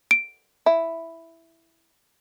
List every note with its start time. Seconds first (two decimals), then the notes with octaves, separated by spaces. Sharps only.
0.11 D7
0.66 E4